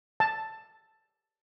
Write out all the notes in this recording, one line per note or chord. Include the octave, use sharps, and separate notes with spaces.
A5